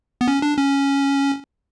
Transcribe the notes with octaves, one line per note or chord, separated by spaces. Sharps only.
B3
C#4
D4
C#4